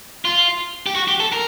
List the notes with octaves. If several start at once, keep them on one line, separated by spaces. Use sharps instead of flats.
F4
G4
F#4
G4
A4
A#4